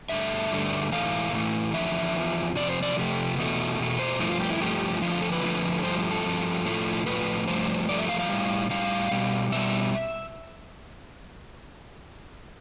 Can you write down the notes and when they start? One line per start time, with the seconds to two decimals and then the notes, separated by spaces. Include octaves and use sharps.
0.09 G2 D3 A3 E5
0.51 G2 D3 A3
0.92 A2 E3 A3 F5
1.32 A2 E3 A3
1.73 E2 D3 F3 E5
2.14 E2 D3 F3
2.56 F2 C3 D5
2.69 C5
2.83 D5
2.96 F2 C3 A3
3.38 E2 B2 A3
3.79 E2 B2 A3
3.99 C5
4.19 G2 F3 A3 E4
4.29 F4
4.40 G4
4.50 E4
4.60 G2 F3 A3 G4
5.01 F2 D3 F3 A3 F4
5.12 F4
5.22 A4
5.32 B4
5.43 F2 D3 F3 A3
5.83 G2 F3 A3 C5
6.11 A4
6.25 G2 F3 A3
6.65 A2 F3 A3
7.06 A2 F3 A3 B4
7.48 G2 F3 A3 C5
7.88 G2 F3 A3 D5
7.99 E5
8.09 F5
8.19 F5
8.29 A2 G3
8.70 A2 G3 F5
9.11 B2 G3
9.52 B2 G3 E5